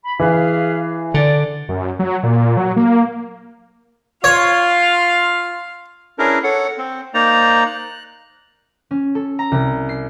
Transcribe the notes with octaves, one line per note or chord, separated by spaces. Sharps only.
B5
E3 G#4 B4 F5
D3 D5
F#2
F#3
A#2
F#3
A#3
F4 C#5 F5
C#4 D4 E4 G#4 A#4 B4
A4 C#5 F#5
C4
A#3 D#4 C5 D5 A#5
F#6
C#4
A4
A#5
C2
C7